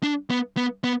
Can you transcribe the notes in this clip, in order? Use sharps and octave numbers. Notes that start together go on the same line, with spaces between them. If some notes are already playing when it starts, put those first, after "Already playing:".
D4
B3
B3
B3